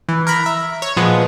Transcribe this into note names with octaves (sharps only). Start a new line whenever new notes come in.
E3
A#4 A#5 B5
E5
C#5
A#2 F3 G#3 B3